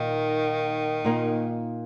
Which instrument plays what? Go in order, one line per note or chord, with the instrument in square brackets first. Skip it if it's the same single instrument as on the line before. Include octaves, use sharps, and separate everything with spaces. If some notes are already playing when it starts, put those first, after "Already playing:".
Already playing: [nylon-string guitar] A#2 A#3 D#4 [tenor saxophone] D#3
[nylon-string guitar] A#2 A#3 D#4